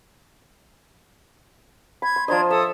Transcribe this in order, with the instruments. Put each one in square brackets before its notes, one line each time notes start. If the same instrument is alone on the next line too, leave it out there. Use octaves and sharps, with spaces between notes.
[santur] B5 [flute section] G#6
[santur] C6
[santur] F3 C5 D#5 [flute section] D4 A#5 G#6
[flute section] A4 D#6 [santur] E5